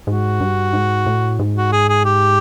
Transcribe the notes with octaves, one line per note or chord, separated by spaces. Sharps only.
G#2 F#4
G2
G#2
A2
G#2
F#4
G#4
G#4
G4